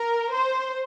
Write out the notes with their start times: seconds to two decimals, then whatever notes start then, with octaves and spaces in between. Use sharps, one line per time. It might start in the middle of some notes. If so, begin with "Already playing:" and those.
Already playing: A#4
0.33 C5